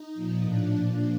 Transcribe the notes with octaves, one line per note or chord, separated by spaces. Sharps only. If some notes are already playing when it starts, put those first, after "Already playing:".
Already playing: D#4
A#2 F3
A2 F3 D4
A#2 F3